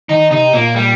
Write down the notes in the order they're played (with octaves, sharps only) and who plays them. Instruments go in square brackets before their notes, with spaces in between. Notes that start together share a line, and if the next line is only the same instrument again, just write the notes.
[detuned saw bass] D#3 [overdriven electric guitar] D#4
[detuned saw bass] C3 [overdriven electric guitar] D#4
[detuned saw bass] A#2 [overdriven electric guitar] A#3
[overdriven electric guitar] G3